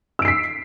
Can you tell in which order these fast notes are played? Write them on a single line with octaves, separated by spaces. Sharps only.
E6 D7 C7 B6